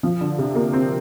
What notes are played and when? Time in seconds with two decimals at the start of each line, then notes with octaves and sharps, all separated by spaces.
0.03 F3
0.21 D3
0.38 C3
0.55 A#3
0.73 C4